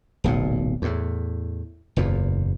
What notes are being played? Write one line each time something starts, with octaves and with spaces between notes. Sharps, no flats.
D1 B1 A#2
E2 A2
F#1 E2 A#2